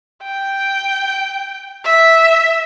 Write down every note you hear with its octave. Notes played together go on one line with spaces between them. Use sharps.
G5
E5